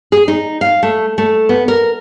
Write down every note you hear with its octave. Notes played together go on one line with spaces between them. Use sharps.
G#4
D#4
F5
A3
A3
B3
A#4